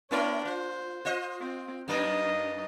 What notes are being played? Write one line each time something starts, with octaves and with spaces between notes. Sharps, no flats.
A#3 D4 E4 A#4 C#5
F4 C5
F4 C5 D#5
C4
F#2 A#3 D4 D#4 D#5